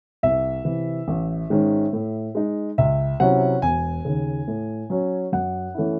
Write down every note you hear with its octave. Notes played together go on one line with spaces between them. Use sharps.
C2 E5
C3 E3
A1
G#2 D#3 G#3 C#4
A2
G#3 D#4
C#2 E5
C3 F#3 C#4 E4 F#5
E1 G#5
D#2 C#3
A2
F#3 C#4
F#2 F#5
E3 A3 C#4 E4